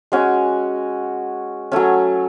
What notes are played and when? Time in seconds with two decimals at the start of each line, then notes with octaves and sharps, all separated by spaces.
0.12 G#3 C#4 F#4
1.72 F#3 A3 C#4